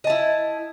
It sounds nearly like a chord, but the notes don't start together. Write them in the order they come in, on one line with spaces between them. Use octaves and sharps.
D#5 A5 E4